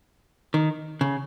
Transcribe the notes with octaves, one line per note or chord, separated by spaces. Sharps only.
D#3
C#3